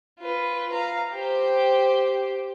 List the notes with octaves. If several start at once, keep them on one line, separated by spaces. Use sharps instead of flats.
F4 B4
F5 A#5
G4 C5